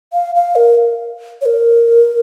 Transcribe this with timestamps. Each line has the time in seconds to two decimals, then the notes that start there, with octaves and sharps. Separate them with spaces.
0.13 F5
0.35 F5
0.55 A#4
1.41 C#5
1.46 A#4